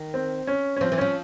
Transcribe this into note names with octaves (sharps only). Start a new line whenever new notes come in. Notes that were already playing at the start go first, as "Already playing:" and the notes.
Already playing: D#3
C4
C#4
C#4
F3 C4
E3
F3 C#4